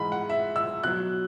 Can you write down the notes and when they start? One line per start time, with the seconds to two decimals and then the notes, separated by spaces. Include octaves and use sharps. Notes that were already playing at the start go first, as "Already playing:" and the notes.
Already playing: G#2 E3 G#3 B5
0.12 F#5
0.30 E5
0.56 E6
0.83 B2 F#3 F#6